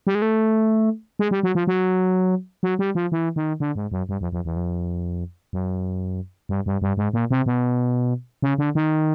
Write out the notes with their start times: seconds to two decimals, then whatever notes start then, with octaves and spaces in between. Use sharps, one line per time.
0.07 G3
0.15 G#3
0.22 A3
1.19 G#3
1.31 G3
1.43 F#3
1.55 F3
1.67 F#3
2.63 F#3
2.79 G3
2.95 F3
3.12 E3
3.36 D#3
3.60 D3
3.76 G#2
3.92 F#2
4.09 G2
4.21 F2
4.32 F2
4.45 E2
4.56 F2
5.53 F#2
6.49 G2
6.66 G2
6.82 G2
6.97 G#2
7.13 A#2
7.31 C3
7.46 B2
8.42 C#3
8.58 D3
8.75 D#3